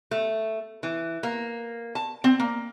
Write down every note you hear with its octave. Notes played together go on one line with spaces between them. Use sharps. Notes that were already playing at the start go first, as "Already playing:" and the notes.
A3
E3
A#3
A5
C4
A#3